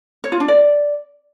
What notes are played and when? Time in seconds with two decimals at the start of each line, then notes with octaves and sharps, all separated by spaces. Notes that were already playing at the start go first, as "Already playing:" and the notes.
0.24 C#5
0.32 F4
0.40 D4
0.48 D5